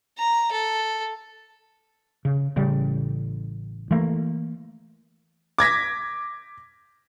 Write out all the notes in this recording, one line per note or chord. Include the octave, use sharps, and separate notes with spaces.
A#5
A4
C#3
A1 C#3 G3
E3 A3 A#3
D6 G#6 A#6 B6